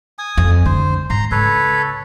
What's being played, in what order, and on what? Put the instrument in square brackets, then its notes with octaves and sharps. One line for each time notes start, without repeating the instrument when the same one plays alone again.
[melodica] G#5 D#6
[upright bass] F2
[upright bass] D3 [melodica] C5
[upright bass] G#2 [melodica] A#5 C6
[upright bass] C#3 [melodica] A4 B4 C#5